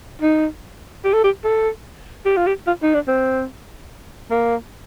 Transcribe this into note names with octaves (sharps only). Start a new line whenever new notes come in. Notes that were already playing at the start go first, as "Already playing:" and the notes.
D#4
G4
A4
G4
A4
G4
F4
G4
F4
D#4
D4
C4
A#3